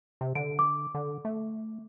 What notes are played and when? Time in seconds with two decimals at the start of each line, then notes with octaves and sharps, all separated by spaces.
0.21 C3
0.35 D3 D7
0.59 D6
0.95 D3
1.25 A3